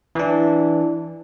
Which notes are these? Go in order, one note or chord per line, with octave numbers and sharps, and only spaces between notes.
E3 D4